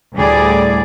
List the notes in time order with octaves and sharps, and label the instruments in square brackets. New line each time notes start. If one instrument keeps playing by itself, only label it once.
[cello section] D2 A2 G3 G#4 D5